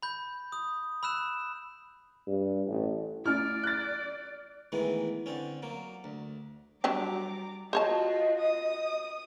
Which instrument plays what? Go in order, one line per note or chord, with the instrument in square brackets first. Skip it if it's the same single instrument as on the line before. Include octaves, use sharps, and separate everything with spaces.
[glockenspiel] B5 G6
D#6
B5 E6 F#6 E7
[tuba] G2
A1
[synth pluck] A3 C#4 E4 [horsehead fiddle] D5 [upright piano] F6
[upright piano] F#6 A6
[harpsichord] B2 D#3 E3 G#3 A3
D3 C4 C#4
F#3 A#3
D2
[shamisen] F#3 D4 G4 [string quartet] G3 A#5 D6
[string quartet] F4 F#4 [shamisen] C5 C#5 A5 [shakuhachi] D#5
[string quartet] D#6